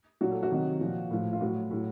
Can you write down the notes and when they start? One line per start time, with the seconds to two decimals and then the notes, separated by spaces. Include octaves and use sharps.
0.21 A#2 F#3 F#4
0.31 A4
0.43 F#4
0.51 C3 D#3 F#3
0.81 A#2 F3
1.11 A2 F3
1.33 F4
1.40 A2 F#3 F#4
1.71 A2 F#3